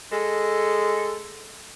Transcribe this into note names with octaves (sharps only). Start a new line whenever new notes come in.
G#3 A4